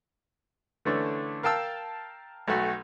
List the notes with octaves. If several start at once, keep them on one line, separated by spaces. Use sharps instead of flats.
D3 E3 A3 C#4 D4
A#4 F5 G5 A5 E6
B1 A3 F#4